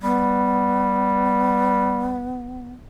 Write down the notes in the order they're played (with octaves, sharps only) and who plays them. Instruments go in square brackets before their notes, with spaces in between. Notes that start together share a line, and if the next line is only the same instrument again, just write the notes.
[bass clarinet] G3 [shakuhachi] B3